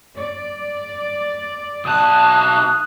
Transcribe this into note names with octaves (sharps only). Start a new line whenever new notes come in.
D5
B1 A5 D#6 F#6